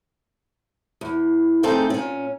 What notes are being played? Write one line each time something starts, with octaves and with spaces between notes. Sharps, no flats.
E2
A3 C4 D#4 G#4 A4 G5
A#2 C#4